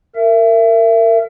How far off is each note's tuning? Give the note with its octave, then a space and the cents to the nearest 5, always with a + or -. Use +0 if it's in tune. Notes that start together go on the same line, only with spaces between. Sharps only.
A#4 -25 E5 +25